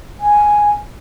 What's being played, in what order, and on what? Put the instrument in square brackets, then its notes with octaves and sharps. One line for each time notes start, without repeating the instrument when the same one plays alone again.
[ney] G#5